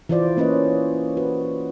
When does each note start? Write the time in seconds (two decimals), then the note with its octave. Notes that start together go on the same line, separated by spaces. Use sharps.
0.09 E3 E4 F4 C5 D5
0.37 A#3 C#4 B4 C#5 D#5
1.17 F#4 B4